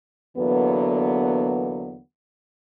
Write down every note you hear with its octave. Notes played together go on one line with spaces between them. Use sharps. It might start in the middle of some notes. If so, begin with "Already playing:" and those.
E2 D3 F#3 A#3 B3